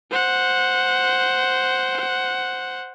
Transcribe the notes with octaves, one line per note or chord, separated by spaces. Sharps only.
C5 F#5